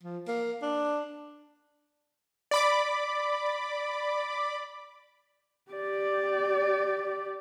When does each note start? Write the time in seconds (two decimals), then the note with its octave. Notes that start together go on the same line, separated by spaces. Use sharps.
0.03 F3
0.27 A#3
0.62 D4
2.51 D5 B5 D6
5.71 G4 D5